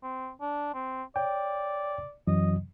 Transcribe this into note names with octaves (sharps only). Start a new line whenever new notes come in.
C4
D4
C4
C#5 D5 G5
F#2 E3 F#3 D#5